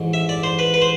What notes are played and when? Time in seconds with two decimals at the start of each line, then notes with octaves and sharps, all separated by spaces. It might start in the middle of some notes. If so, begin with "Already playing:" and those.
Already playing: A1 G#2
0.13 E5
0.29 D5
0.43 C5
0.59 B4
0.74 B4
0.82 C5